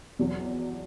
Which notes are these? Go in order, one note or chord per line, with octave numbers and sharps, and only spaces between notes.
E2 B2 F#3